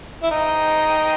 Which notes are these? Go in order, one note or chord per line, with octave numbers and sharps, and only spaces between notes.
E4
D#4 G#4 C5 D#5 G5